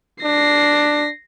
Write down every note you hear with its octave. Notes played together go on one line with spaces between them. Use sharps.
D4 A#6 C7